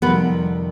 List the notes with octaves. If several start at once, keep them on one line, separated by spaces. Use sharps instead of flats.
F2 C3 D#3 G3 B3 B4